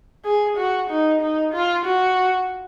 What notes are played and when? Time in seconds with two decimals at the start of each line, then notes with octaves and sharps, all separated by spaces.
0.25 G#4
0.57 F#4
0.89 D#4
1.21 D#4
1.53 F4
1.85 F#4